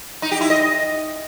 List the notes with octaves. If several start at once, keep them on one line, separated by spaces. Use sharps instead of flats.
D#4
G4
E4
D#5